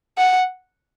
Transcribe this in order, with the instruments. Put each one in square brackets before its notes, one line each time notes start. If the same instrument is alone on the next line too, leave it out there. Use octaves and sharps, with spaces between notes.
[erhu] F#5